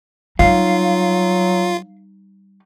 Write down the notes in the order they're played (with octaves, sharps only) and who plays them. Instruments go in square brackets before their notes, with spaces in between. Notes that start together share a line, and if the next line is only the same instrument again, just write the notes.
[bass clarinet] F#3 [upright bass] G3 D#4 [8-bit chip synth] F4 [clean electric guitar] F5